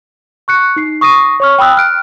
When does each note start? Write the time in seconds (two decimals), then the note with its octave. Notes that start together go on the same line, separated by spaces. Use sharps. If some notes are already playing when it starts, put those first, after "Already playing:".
0.48 C#6 F#6 C#7
0.76 D#4 C7
1.01 C#6 D#6 A#6 C7 D#7
1.40 C#5 C#6 F6
1.59 G5 B5 D#6 E6 F#6
1.77 F6 F#6 D7